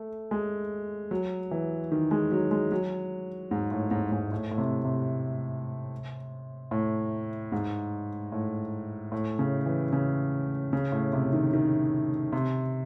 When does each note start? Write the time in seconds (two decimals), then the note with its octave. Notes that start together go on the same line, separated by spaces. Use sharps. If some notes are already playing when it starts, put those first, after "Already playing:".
Already playing: A3
0.31 G#3
1.11 F#3
1.51 E3
1.92 D#3
2.11 G#3
2.31 F#3
2.51 G#3
2.72 F#3
3.51 G#2
3.71 A2
3.91 G#2
4.12 G#2
4.32 A2
4.51 A2
4.58 C3
4.85 C3
6.71 A2
7.52 G#2
8.32 A2
9.12 A2
9.39 C#3
9.66 E3
9.93 C#3
10.73 C#3
10.92 A2
11.13 C3
11.33 D#3
11.53 D#3
12.33 C3